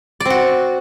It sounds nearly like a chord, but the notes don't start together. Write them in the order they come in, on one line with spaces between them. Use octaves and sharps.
D5 C4 F#4